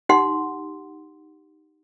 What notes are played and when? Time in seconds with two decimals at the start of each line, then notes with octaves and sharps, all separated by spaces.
0.09 D#4 G4 F#5 C6